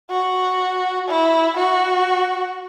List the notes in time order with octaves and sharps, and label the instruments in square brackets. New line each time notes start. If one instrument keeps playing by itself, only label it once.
[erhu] F#4
E4
F#4